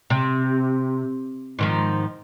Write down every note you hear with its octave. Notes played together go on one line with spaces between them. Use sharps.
C3
G#2 D#3 F3